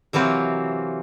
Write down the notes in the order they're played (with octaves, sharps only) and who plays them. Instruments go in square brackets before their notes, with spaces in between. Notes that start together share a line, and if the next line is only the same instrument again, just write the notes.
[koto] C3 E3 F#3 A#3 C4